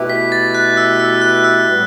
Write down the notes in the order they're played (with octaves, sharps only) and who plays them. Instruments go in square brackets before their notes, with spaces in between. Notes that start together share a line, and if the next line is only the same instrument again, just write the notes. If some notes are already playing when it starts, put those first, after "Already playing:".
Already playing: [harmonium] B2 A3 E4 G4 B4
[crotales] B6
A6
F#6
E6
E6
F#6
E6
[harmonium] A2 G3 B3